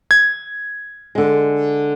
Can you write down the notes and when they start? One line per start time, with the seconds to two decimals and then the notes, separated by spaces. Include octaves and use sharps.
0.11 G#6
1.15 D3 G#3